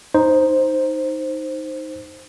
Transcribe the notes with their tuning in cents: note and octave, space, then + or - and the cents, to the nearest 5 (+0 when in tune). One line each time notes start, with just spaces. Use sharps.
D#4 +0 C5 +0